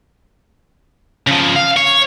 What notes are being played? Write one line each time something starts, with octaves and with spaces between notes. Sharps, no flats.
C#3 F3
F5
C#5